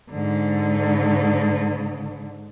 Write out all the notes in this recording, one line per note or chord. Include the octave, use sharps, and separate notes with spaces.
G#2 D3